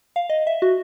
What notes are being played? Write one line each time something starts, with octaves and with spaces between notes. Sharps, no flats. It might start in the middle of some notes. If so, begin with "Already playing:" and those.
F5
D#5
E5
F#4